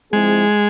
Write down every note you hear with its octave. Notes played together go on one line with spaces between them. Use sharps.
F3 G#3 C4 E4 G#4